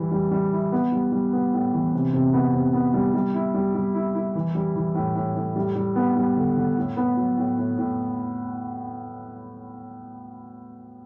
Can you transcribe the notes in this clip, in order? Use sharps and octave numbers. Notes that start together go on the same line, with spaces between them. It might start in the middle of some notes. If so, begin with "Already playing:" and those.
Already playing: E3 G3 E4
G3
G3
E4
B3
G3
G3
B3
A2
E3
C3
C3
B3
C3
B3
G3
G3
E4
G3
G3
E4
E4
E3
G3
E3
A2
A2
A2
G3
G3
B3
G3
D3
D3
A2
B3
F#3
A2
A2
A2